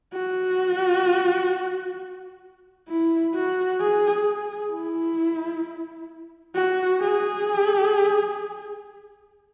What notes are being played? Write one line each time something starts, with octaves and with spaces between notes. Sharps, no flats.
F#4
E4
F#4
G#4
G#4
E4
F#4
G#4